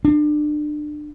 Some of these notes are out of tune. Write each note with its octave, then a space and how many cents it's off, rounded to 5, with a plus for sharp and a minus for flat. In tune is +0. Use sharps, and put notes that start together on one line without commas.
D4 +30